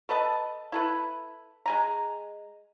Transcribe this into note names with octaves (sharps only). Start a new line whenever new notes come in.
A4 B4 D#5 A5
E4 A4 B4
G#3 G#5 A#5